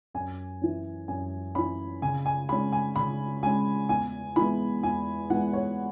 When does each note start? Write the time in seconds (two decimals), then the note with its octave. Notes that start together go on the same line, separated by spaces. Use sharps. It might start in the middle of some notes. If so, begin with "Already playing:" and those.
0.14 F#2 G#5
0.61 E3 C#4
1.08 F#2 G#5
1.55 E3 C#4 B5
2.02 C#3 G#5
2.26 G#5
2.49 G#3 C#4 B5
2.72 G#5
2.96 C#3 B5
3.43 G#3 C#4 G#5
3.89 E2 G#5
4.36 E3 G#3 B3 B5
4.83 E2 G#5
5.30 E3 G#3 B3 F#5
5.53 C#5